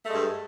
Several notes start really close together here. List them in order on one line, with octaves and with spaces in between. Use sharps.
A3 G#3 G2